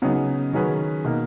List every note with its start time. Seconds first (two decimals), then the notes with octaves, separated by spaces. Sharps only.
0.02 C#3 F#3 B3 D#4
0.53 D#3 F#3 C#4 G#4 B4
1.04 B2 A#3 D#4